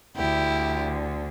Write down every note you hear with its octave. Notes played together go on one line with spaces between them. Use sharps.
D2 D3 E4 G4